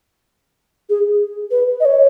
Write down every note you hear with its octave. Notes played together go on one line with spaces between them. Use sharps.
G#4
B4
D#5
C#5